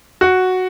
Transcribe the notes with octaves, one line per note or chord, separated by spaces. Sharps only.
F#4